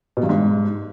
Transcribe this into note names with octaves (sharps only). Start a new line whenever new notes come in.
B2
G2
G#2